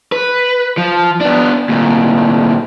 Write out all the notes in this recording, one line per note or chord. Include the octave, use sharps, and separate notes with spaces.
B4
F3
B3 D4
D2 A#2